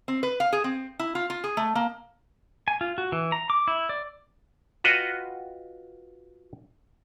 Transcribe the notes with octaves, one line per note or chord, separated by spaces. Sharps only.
C4
B4
F5
G#4
C4
E4
F4
F4
G#4
A3
A#3
G#5
F4
F#4
E3
A#5
D6
E4
D5
F4 F#4 B4 D#5 F#5 G5